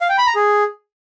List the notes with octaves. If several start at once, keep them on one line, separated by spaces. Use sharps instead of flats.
F5
G5
B5
A#5
G#4